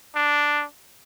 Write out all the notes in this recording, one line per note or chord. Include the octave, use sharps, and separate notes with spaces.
D4